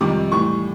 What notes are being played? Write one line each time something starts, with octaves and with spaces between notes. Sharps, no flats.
F2 C3 D#3 G3 D6
A2 E3 G3 C#6